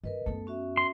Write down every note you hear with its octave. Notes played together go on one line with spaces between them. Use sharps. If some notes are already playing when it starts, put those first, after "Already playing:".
G2 A#4 B4 D#5
F#2 A3 B3 A4
C#4 F#4 E5
C6